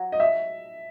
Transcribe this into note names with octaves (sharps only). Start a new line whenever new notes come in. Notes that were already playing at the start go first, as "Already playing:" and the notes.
Already playing: F#3
D#5
E5